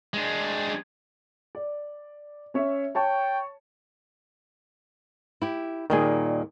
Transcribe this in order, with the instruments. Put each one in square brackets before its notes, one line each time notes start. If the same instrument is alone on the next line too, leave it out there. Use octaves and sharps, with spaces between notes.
[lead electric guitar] G#3 D4
[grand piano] D5
C#4 C#5 E5
[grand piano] C#5 A5 C#6 [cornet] G5
[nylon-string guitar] E4 G4
[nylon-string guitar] D#2 A#2 G3 [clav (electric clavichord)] D#3 G#4